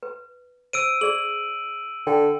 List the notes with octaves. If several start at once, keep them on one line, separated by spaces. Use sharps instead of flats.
B4
C5 E6 D7 D#7
G#4 D5 F#7
D3 G5